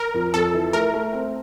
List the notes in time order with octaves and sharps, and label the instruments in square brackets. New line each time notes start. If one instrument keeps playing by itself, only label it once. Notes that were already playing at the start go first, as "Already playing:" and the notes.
Already playing: [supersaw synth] A#4
[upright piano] F2
[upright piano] F2 [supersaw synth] A4
[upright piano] E3
[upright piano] A3 [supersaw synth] A#4
[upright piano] A3
C4